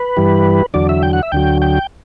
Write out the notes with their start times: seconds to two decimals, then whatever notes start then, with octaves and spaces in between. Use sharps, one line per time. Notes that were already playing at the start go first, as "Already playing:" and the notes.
Already playing: B4
0.17 G2 E3 G3
0.74 E2 D3 F#3 D5
0.89 E5
1.03 G5
1.13 F#5
1.23 E5
1.32 D2 D3 F#3 G5
1.62 G5